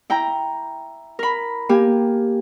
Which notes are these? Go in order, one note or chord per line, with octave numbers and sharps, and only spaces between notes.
E4 G5 A#5
A#4 B5
A#3 G4 G#5